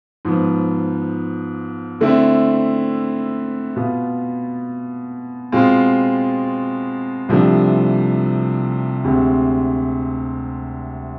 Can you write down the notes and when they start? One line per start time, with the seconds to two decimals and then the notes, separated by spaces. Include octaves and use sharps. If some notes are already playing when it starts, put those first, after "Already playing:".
0.25 G#2 F3 B3
2.01 D3 A3 C4 E4
3.76 B2 B3 F4
5.52 B2 G#3 C4 F4
7.29 C2 C3 F3 A3 D4
9.04 D2 C3 G#3 C4